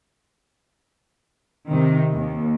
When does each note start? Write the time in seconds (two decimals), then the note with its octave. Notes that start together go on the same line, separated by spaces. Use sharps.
1.71 C3 D#3
2.14 D#2